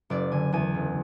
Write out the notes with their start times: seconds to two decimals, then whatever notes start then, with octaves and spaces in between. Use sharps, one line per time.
0.10 F#1 D5
0.32 D3 G#5
0.52 E2 G#5
0.74 F#1